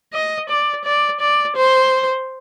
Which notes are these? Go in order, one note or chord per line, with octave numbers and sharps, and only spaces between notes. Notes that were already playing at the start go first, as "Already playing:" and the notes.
D#5
D5
D5
D5
C5